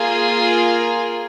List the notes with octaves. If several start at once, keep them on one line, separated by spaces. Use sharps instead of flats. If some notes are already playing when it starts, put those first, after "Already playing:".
Already playing: A#3 F4 G#4
A#4